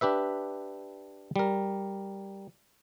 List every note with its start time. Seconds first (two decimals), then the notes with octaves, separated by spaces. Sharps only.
0.01 D4 G4 B4 E5
1.36 G3 A#4